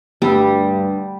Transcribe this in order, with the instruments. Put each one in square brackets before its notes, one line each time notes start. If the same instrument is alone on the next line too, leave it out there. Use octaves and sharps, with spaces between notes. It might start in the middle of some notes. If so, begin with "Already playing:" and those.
[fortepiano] D2 B5 E6 [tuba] G2 [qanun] G3